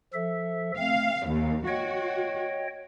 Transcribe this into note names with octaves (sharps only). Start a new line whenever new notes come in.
F3 A4 E5
A3 C4 F5
D#2 A#3
F#4 C#5 D#5 G5